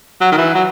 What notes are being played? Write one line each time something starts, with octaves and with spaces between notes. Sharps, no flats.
F#3
D#3
E3
F#3